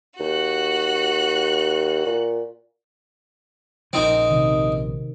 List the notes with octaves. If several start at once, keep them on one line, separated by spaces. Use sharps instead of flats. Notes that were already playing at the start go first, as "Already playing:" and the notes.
D#2 F#4 F#6
A#2
A#1 C#3 C4 D#4 A#4
C3 D#3